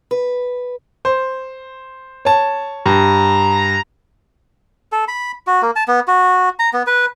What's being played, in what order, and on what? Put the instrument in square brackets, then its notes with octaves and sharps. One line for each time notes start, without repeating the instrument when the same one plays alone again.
[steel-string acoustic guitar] B4
[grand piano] C5
C#5 A5
[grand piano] G2 [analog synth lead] A#5
[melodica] A4
B5
F#4
A#3
A5
B3
F#4
A#5
B3
B4